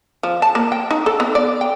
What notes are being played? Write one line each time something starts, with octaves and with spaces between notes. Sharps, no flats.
F3
A5
A#3
G5
D#4
A4
B3
D5
G5